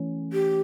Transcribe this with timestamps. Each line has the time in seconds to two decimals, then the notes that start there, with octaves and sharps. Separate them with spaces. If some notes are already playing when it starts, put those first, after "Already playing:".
Already playing: E3 A3 C#4
0.33 G4